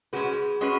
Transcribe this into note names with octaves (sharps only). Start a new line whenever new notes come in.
G#3 C#4 F#4 G#4 B4
G#3 C#4 F#4 B4